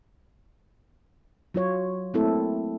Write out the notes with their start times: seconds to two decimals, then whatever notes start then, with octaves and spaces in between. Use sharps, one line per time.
1.54 F#3 F4 C#5
2.14 A3 A#3 C4 E4 A4